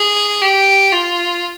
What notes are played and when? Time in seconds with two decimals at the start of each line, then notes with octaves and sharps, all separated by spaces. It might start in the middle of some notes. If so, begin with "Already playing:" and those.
Already playing: G#4
0.41 G4
0.92 F4